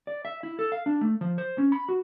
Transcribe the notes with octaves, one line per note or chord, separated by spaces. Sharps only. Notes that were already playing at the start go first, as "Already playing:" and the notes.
D5
E5
E4
A4
F5
D4
A3
F3
C5
C#4
B5
F#4